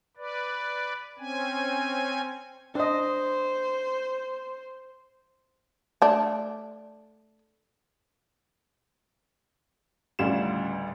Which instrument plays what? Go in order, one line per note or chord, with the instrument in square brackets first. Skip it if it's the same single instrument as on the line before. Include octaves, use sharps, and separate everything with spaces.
[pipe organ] B4 D5
C4 C#4 G#5
[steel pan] D4 D#5 [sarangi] C5
[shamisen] A3 D4
[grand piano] A1 D2 C#3 G3 F4 E7